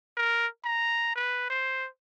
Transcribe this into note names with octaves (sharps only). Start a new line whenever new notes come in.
A#4
A#5
B4
C5